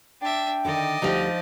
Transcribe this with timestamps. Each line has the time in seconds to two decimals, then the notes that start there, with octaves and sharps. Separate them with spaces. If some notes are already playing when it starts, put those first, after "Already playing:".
0.21 D4 E5 G5
0.65 D3 D#3 A#4 D5 D#5
1.02 D2 F3 G3 D#4 G4